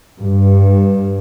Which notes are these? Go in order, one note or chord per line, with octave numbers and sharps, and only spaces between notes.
G2